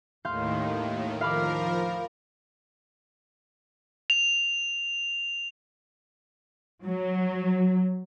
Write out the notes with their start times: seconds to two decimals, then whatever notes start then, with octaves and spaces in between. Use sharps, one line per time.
0.25 D#2 A2 D#3 F5 C6 G6
1.21 F3 A#4 F5 B5 D6
4.10 F7
6.84 F#3